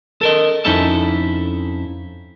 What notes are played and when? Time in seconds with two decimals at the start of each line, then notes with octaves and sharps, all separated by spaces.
0.21 A4 A#4 D#5
0.65 F2 C#4 D#4 E4 A4 A5